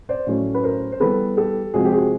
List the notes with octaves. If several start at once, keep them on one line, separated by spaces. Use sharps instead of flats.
C5 D5
A2 F#3 A3 C#4
B4
A#4 C5
C5
E3 G3 B3 A4 B4
G4 A4
C3 F3 G#3 C4 F#4 G#4
G4
F#4 G#4